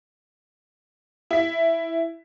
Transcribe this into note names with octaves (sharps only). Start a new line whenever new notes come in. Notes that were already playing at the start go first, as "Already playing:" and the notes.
E4 B6